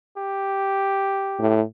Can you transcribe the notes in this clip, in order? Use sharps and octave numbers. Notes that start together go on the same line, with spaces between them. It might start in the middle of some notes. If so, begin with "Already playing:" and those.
G4
A2